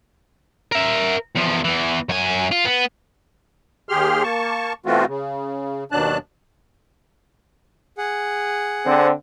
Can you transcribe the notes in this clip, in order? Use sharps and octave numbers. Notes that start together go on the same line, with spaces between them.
A#4 E5
E2 F3
E2 E3
F#2 G#5
F4
B3
D#2 G4 G#4 C6 F6
A#3 A5 C#6
B2 E3 A3 C4 F4 F#4
C#3
D#2 B2 F#3 D4 A5 F#6
G#4 F#5
D3 C4